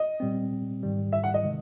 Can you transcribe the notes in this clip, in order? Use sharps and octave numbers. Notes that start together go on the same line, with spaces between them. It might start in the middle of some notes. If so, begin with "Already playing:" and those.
Already playing: D#5
A#2 G3 C4
G#2 D#3 G3
E5
F#5
D#5
C3 D#3 G#3